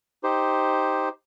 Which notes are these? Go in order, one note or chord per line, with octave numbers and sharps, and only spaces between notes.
D#4 G4 C5